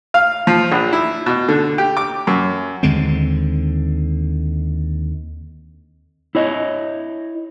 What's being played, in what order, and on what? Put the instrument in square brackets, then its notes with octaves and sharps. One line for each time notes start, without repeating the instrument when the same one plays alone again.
[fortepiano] F5
F3
A#1
E4
B2
D3
G4
D6
F#2
[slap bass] D#2 D3 G#3 C4
[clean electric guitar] E4 C#5 D#5